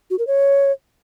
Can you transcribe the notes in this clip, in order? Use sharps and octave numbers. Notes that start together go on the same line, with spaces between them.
F#4
A#4
C#5